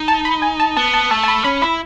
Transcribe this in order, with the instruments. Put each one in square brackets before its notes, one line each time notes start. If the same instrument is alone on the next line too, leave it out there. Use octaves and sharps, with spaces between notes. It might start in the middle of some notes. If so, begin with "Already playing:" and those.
Already playing: [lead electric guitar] D#4
[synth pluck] A5
B5
G#5
A5
[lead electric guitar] B3 [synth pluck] A5
[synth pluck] A5
[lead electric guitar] A3 [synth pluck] A5
[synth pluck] A5
B5
[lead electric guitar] C#4 [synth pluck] B5
[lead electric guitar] E4 [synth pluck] B5